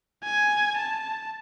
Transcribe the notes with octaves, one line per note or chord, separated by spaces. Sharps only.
G#5
A5